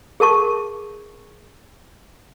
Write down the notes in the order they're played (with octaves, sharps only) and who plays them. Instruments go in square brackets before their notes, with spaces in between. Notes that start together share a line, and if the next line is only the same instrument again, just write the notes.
[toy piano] G#4 A#4 A5 C#6